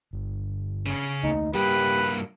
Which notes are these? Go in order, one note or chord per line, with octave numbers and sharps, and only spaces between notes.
G1
C#3 C#4
D2 A3 A#3 D#4
G2 G3 A#3 G4 B4